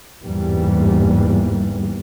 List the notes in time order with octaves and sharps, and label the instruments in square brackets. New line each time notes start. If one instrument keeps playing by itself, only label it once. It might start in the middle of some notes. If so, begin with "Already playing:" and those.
[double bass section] G1 E2 G#2 E3 G3 A#3